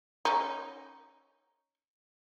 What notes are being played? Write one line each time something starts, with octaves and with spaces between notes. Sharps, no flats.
C#4 D#4